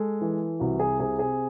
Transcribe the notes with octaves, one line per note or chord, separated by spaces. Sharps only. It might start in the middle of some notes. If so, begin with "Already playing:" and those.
Already playing: G#3 A4
E3
C2 F#4
G#4
C3 G#4
G#4